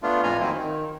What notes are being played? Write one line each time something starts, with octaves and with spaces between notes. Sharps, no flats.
A3 B3 D4 F4
F2 A2 F4 G#5 A#5
D#3 F#3 A#3 C4 E4
D#3